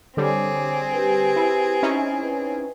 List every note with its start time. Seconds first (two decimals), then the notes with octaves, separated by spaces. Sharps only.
0.17 D3 G3 C4 G#4 C#5 D6
0.94 G4 B4
1.36 E4
1.83 C#4 D#4 E4
2.23 B4